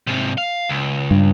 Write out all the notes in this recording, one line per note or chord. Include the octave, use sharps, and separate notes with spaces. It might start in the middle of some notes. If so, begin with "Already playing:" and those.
G#2 C3
F5
C#2
G2